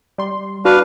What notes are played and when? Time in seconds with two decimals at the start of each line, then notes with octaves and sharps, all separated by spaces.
0.18 G3 C6
0.65 D4 F#4 B4 F5